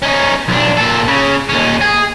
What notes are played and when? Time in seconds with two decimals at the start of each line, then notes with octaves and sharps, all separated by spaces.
0.02 C#4 D#4
0.49 B1 D4
0.77 A#2 A4
1.08 C#3
1.50 D#2 C#4
1.82 G#4